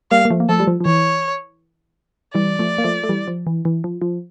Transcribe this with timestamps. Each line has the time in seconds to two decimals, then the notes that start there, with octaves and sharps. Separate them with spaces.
0.11 G3 A#3 F5
0.25 A#3
0.30 F3 A3
0.40 A#3
0.49 F3 A3 A4
0.60 G3
0.67 F3
0.80 F3
0.86 E3 C#5
2.34 E3 G3 D5
2.59 F3 A3
2.78 A#3
2.84 F3 A3
3.04 A3
3.09 E3 G3
3.28 F3
3.47 E3
3.65 E3
3.84 F3
4.02 F3